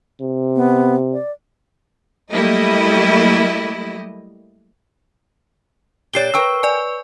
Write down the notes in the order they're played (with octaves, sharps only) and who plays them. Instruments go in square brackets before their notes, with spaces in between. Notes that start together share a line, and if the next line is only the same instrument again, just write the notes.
[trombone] C3
[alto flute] B3
D5
[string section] F#3 G3 A3 A#3 E4 D#5
[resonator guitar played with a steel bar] A#2 G4 D5 [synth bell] C#5 C7 G7
[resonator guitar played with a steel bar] A#4 G5 A#5 [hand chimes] B4 C#6 E6
[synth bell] D5 G#5